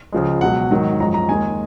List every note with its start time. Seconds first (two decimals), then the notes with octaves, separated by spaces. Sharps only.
0.12 C#2 C#3 F3 G#3
0.41 C#2 B2 F#3 F#5
0.71 G#2 D#3 F#3
1.00 F#2 F3 G#3 A#5
1.14 A#5
1.28 D#2 D#3 G#3 G#5